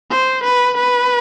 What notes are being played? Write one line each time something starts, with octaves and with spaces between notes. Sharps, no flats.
C5
B4
B4